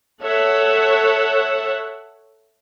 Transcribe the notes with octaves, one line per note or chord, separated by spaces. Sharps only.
A4 C#5 E5 F#5